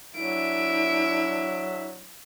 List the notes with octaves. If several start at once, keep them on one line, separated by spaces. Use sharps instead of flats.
F#3 D4 E4 E5 D7